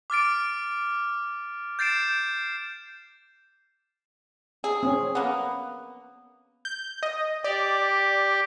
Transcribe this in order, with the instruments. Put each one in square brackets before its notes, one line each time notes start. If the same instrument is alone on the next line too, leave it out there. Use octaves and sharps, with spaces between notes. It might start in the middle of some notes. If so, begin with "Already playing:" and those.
[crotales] D6 F6 A6 D7
G6 A6 C7 D7 E7
[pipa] G#4
[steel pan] C4 C#4
[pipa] A#3 B3
[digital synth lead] G6
D#5
[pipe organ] G4 [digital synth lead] D5